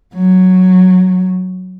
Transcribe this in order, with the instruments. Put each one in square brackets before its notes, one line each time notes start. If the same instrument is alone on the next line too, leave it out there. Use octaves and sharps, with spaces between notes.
[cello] F#3